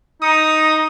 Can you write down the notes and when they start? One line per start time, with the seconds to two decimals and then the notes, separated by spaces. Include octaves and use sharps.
0.22 D#4 D#6